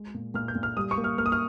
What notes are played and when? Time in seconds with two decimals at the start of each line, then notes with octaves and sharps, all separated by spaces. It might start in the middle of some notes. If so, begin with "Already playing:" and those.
Already playing: G#3
0.14 A#2
0.34 A#2 F6
0.48 G6
0.55 A#2
0.63 F6
0.77 G3 D#6
0.91 C#6
0.98 A#3
1.04 F6
1.18 A#3 F6
1.26 D#6
1.32 F6